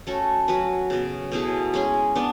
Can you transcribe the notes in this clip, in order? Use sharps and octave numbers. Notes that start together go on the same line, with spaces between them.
A3 C#4 F#4 A4
F#3 C#4 F#4 B4
C#3 F#3 B3
B2 A3 E4 G#4
G#3 C#4 G#4
B3 D4